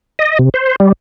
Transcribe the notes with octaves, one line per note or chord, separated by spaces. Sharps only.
D#5
C3
C5
G3